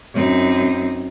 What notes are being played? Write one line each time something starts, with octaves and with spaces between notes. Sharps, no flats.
F#2 C4 D#4